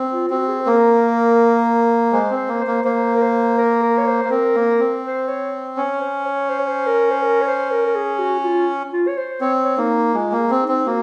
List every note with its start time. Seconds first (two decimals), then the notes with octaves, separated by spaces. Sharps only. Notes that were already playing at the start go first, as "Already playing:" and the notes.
Already playing: C4
0.12 F4
0.30 C4 F#4
0.48 G#4
0.60 C5
0.66 A#3 A#4
2.12 G#3 C5
2.30 C4
2.36 C5
2.49 A#3
2.60 C5
2.67 A#3
2.85 A#3 C5
3.14 A#4
3.21 C5
3.58 A#4
3.82 A#4
3.98 C#5
4.07 C5
4.25 A#3
4.30 C4 A#4
4.55 A#3
4.79 C4
5.04 C5
5.28 C#5
5.76 C#4 C#5
6.01 C5
6.25 C#5
6.49 C5
6.58 C#5
6.67 C5
6.86 A#4
7.10 C5
7.22 A#4
7.41 C#5
7.47 C5
7.71 A#4
7.86 A#4
7.95 G#4
8.19 F#4
8.39 F#4
8.43 F4
8.93 F4
9.07 C#5
9.17 C5
9.41 C4 C#5
9.63 C#5
9.77 A#3 D#4
10.14 G#3 F4
10.32 A#3
10.38 G#4
10.50 C4
10.63 D#4
10.68 C4
10.86 A#3 F#4